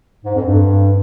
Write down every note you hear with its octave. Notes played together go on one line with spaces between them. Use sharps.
G#2
F2
G2